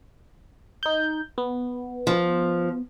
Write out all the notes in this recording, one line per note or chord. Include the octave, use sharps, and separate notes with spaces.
D#4 G6
B3
F3